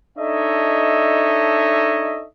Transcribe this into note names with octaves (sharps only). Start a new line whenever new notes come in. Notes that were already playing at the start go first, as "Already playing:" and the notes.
D4 D#4 A4 C#5 D#5 E5